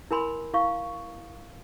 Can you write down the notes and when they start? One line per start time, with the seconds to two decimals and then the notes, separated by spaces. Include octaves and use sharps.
0.11 E4 A#4 G#5 B5 C6
0.54 E4 F5 C#6